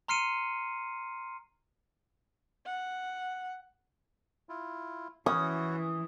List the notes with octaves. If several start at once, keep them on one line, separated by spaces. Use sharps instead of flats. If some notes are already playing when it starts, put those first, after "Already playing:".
A#5 C6 F6 C7 C#7 D#7
F#5
E4 F4
E3 C#4 E4 F#4 C#5 D#6